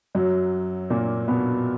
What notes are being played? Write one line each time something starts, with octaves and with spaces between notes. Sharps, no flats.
F#2 F#3
A#2 A#3
B2 B3